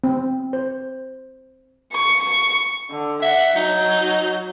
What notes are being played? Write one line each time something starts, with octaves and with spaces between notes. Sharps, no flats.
C4
C5
C#6
D3
E5 F#5
F#3 D#4